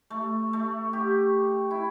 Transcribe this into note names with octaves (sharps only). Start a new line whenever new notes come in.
A3
A3
G4
E4